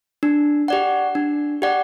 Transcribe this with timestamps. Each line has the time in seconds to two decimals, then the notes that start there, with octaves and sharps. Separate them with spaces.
0.23 D4
0.68 G4 D5 F#5
1.15 D4
1.62 G4 D5 F#5